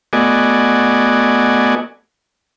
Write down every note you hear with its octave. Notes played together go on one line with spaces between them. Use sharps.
A3 B3 F#4 D5 D#5 G#5